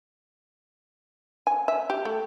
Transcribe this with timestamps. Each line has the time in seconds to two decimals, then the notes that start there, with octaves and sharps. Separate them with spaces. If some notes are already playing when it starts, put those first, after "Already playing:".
1.47 G#5
1.68 E5
1.90 G4
2.05 A3